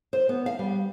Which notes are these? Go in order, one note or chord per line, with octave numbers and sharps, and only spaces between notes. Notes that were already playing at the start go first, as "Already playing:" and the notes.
C5
B3
F5
G3